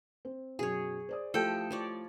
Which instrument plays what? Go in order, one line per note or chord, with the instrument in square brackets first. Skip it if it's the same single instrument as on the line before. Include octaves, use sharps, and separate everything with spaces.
[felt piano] C4
[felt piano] F#2 B2 [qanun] G#4 C#5
[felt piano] C5 D5 D#6
[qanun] F3 [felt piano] A3 E4 G4 [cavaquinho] A4 G5
[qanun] F3 C#5 D5